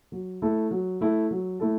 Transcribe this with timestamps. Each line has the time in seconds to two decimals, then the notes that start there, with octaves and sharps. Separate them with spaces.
0.12 F#3
0.42 A3 E4 A4
0.71 F#3
1.01 A3 E4 A4
1.31 F#3
1.60 A3 E4 A4